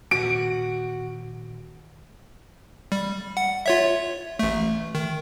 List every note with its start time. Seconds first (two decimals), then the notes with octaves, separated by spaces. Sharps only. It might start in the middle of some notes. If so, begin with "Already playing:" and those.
0.11 D#2 A#2 D#3 F#4 D7
2.92 G3
3.37 F#5
3.66 F4 C#5 E5
4.39 A1 A3
4.95 D#3